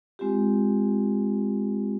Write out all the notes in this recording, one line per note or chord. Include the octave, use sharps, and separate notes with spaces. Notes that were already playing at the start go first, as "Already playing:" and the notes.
G#3 C4 F4 G4